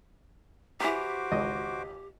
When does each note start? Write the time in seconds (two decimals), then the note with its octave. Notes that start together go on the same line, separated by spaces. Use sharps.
0.80 D#3 E3 F#4 G4 C5 D6
1.32 G#1 C#2 D#5